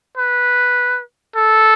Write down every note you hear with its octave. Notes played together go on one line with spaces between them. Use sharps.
B4
A4